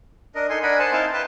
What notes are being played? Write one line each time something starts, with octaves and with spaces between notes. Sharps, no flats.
D4 A#4 D#5
D#4 A4 G#5 C6
D4 A#4 D#5 F#5 G#5 B5
C5 F#5 G#5 A5
C4 D#4 E4 F5 G5 A5
B4 G5 A5